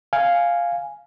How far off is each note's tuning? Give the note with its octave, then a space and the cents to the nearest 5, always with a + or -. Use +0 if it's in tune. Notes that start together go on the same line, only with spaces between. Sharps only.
F5 +0 G#5 +0